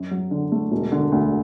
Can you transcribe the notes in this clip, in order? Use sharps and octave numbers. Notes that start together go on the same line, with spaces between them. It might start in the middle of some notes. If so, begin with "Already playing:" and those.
Already playing: F#2
F#3
D3
A3
E1
D3
D2